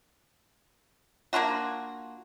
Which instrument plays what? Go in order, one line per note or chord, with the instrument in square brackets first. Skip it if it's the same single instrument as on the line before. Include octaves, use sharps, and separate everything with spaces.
[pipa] A#3 D4 F4 F#4